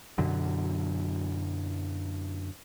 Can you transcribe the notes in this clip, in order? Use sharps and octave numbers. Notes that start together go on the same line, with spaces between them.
F#2 B2 D3 F#3